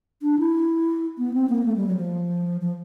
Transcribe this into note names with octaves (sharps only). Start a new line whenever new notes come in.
D4
E4
B3
C4
A#3
A3
G3
F#3
F3
F3